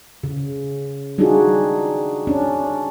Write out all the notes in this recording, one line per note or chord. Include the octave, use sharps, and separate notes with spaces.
C#3
G3 D4 D#4 F4 F#4 G#4
C#4 D4